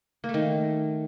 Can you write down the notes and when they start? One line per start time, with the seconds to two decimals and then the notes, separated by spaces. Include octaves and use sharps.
0.24 A#3
0.29 A3
0.34 D#3